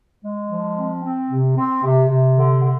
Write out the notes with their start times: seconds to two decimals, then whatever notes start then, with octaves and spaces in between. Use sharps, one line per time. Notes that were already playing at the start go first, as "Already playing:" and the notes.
0.23 G#3
0.49 F3
0.76 C4
1.03 C4
1.30 C3
1.57 C4
1.83 C3
2.09 C3
2.36 D3
2.63 D3